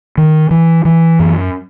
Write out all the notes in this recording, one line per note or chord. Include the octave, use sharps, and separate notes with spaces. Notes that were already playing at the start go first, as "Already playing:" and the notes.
D#3
E3
E3
F#2